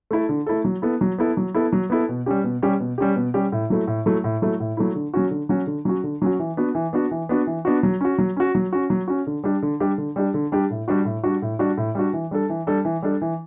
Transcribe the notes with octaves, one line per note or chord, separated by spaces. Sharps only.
A3 E4 A4
D3
A3 E4 A4
F#3
B3 E4 A4
F#3
B3 E4 A4
F#3
B3 E4 A4
F#3
B3 E4 A4
B2
G3 C#4 G4
B2
G3 C#4 G4
B2
G3 C#4 G4
B2
G3 C#4 G4
A2
F#3 A3 E4
A2
F#3 A3 E4
A2
F#3 A3 E4
A2
F#3 A3 E4
D3
F#3 C#4 F#4
D3
F#3 C#4 F#4
D3
F#3 C#4 F#4
D3
F#3 C#4 F#4
E3
B3 D4 F#4
E3
B3 D4 F#4
E3
B3 D4 F#4
E3
B3 D4 F#4
F#3
C#4 F#4
F#3
C#4 F#4
F#3
C#4 F#4
F#3
C#4 F#4
D3
G3 D4 G4
D3
G3 D4 G4
D3
G3 D4 G4
D3
G3 D4 G4
A2
G3 D4 F#4
A2
G3 D4 F#4
A2
G3 D4 F#4
A2
G3 D4 F#4
E3
G3 D4 A4
E3
G3 D4 A4
E3
G3 D4 A4
E3